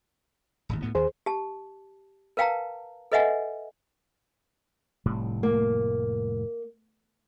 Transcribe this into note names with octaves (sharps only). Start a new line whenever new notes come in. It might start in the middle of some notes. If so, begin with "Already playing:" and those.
D1 G#1 D#2
D2 A2 B3
D#2 D#3 G#4 C5
G4 A5
A#4 B4 F5 G5 A5 A#5
A4 B4 D#5 E5 F#5 G#5
F1 A2 G3
A#3